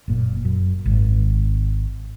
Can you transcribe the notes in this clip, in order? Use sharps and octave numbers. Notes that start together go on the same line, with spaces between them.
F#1 A#2
F#2
G#1